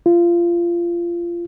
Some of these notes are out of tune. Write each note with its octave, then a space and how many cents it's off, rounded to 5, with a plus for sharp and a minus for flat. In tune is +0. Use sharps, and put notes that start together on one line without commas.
F4 -25